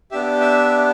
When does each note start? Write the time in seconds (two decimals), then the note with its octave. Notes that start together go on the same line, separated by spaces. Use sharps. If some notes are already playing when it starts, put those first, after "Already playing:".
0.11 B3 D4 G4 E5
0.41 E5